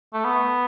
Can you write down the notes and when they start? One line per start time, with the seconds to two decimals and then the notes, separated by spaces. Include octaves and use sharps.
0.14 A3
0.25 B3